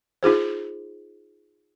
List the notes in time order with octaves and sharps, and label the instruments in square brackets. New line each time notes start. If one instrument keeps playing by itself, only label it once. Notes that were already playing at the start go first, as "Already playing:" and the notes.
[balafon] D#4 F4 G#4 C5